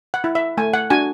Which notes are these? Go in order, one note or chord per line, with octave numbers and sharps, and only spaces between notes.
F#5
E4
E5
A3 G#5
F#5
D4 F#4 G#5